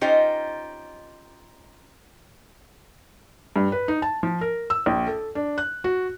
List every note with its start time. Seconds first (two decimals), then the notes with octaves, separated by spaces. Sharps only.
0.01 C#4 D#4 F4 G4 C5 D#5
3.56 G2
3.72 B4
3.88 D#4
4.02 A5
4.23 F3
4.41 A#4
4.70 E6
4.86 A#1
5.07 A4
5.35 D4
5.58 F#6
5.84 F#4